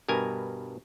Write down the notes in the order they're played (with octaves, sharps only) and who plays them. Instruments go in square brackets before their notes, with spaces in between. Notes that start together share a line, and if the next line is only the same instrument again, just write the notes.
[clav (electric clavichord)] G2 B2 A#4 G#5